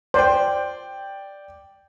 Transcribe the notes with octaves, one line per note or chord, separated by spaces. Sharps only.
C5 D5 G5